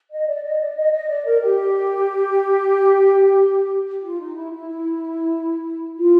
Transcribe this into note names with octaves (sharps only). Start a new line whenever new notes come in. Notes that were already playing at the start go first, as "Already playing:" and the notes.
D#5
D5
D#5
D5
D#5
D#5
D5
A#4
G4
F4
D#4
E4
E4
F4